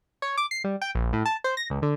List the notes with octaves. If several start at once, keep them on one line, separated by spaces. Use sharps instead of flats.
C#5
D6
C7
G3
G5
A#1
A2
A5
C5
A#6
C#2
D3